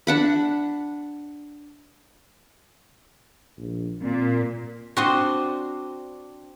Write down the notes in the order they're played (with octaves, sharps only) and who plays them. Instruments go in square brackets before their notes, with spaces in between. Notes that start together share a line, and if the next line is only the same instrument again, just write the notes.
[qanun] D4 F#5 B5
[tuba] A#1
[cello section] A#2 [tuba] C4
[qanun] C4 D4 [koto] F#4 C5 D#5